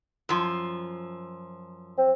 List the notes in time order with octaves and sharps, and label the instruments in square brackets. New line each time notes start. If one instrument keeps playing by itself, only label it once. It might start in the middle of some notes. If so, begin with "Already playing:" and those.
[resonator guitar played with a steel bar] F#2 F3
[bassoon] C4